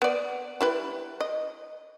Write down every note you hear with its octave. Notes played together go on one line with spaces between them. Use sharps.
B3 D5
G3 E4 B4
D#5